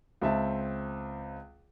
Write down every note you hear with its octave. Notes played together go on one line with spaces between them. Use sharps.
C#2 C4 E5 A5